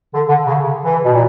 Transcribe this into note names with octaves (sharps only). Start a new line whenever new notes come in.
D3
D3
C#3
E3
B2
A#2